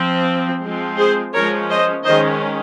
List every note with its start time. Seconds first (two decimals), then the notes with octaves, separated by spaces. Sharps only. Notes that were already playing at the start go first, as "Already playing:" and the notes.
Already playing: F3 C4
0.63 F3 G#3 C4
0.99 G#4 C5
1.34 F3 G#3 C#4 A#4 C#5
1.70 C5 D#5
2.05 D#3 G#3 C#4 C5 D#5